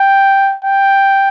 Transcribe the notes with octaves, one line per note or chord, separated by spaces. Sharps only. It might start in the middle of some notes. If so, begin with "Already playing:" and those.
Already playing: G5
G5